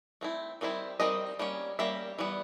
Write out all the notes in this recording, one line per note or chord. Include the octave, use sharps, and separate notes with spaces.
A3 C4 E4
D#3 G3 C4 E4
D#3 G3 C4 D#5
G3 A#3 C#4
G3 A#3 C#4 E5
E3 G3 B3